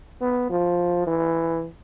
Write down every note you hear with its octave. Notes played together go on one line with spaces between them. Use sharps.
B3
F3
E3